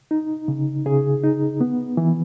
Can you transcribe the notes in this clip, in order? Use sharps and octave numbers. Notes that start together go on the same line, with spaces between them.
D#4
C#3
C#3 G#4
D#4
B3
E3